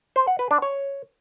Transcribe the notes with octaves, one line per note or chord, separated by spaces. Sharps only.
C5
F#5
B4
D4
C#5